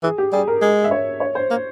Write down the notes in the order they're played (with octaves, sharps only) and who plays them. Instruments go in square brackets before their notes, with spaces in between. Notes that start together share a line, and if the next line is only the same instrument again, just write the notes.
[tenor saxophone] E3 [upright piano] G#4
[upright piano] G4
[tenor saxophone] G3 [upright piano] G#4
[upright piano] A#4
[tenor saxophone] G#3
[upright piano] E5
C#5
C#5
C5
[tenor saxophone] A#3